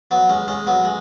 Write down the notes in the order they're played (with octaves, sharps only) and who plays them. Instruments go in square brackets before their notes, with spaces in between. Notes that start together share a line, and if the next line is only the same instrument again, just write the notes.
[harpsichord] F#3 B3
G#3 C#4
G#3 C#4
F#3 B3
G#3